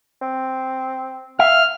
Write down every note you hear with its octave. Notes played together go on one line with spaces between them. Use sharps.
C4
E5 F5 F6